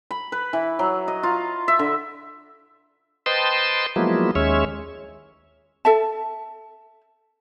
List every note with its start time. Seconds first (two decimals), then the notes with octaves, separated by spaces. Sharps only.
0.11 B5
0.32 B4
0.53 E3
0.79 F#3
1.08 D#5
1.23 F4
1.68 E5
1.79 D3
3.26 B4 C5 D#5 G5 A5 C6
3.96 F3 F#3 G#3 A#3 B3 E4
4.35 D#2 G#3 C#4 C#5 E5
5.85 A4 E5 A5